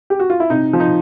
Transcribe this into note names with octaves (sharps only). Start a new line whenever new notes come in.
G4
F#4
F4
E4
C3 D#4
F3
D#4